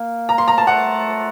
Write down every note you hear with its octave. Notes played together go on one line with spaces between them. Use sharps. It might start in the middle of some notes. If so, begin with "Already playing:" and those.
Already playing: A#3
A#5
C6
A#5
A5
A3 F#5